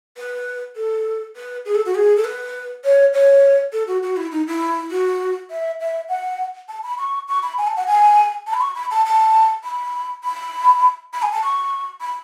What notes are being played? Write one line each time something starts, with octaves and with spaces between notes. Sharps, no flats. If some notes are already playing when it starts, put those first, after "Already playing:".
B4
A4
B4
G#4
A4
F#4
G#4
A4
B4
C#5
C#5
A4
F#4
F#4
E4
D#4
E4
F#4
E5
E5
F#5
A5
B5
C#6
C#6
B5
G#5
A5
F#5
G#5
A5
B5
C#6
B5
A5
A5
B5
B5
B5
G#5
A5
C#6
B5